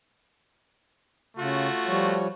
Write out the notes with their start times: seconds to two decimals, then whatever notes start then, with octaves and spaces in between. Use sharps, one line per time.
1.38 C#3 A3 F4 F#4
1.87 F3 G3 C#5